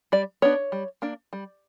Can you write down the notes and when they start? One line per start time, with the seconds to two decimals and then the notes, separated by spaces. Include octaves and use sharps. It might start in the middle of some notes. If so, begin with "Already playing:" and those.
0.12 G3 D5
0.42 B3 D4 C#5
0.72 G3
1.02 A#3 D4
1.33 G3